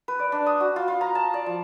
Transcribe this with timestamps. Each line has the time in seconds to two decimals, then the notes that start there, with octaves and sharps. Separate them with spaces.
0.08 B4
0.19 D5
0.32 D4
0.46 D#6
0.60 F#4
0.76 F4
0.88 F4
1.01 A#5
1.15 A5
1.34 D5
1.46 F3